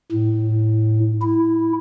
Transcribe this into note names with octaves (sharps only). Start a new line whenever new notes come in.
A2
E4